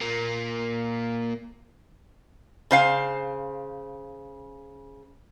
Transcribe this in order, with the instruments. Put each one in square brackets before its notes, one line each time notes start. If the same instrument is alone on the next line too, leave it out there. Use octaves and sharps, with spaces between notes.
[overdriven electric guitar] A#2 A#3
[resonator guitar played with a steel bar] C#3 C5 F5